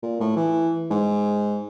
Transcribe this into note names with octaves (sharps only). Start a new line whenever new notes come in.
A#2
A2
E3
G#2